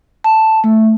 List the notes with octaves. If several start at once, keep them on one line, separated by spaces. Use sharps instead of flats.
A5
A3